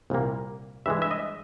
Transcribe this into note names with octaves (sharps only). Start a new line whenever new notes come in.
C2 A#2 G3 A#3
G2 E3 G#3 E5
E5
D#5